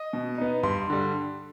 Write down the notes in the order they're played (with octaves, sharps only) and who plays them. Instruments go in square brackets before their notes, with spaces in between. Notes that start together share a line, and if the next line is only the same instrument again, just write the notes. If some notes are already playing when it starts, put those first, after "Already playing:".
Already playing: [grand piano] D#5
B2
B3 D#4
G2 C6
D3 G3